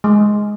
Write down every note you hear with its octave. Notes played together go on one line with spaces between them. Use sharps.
G#3